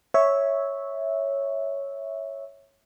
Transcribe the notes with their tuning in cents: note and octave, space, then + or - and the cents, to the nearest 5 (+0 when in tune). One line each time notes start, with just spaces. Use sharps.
C#5 +0 E5 -10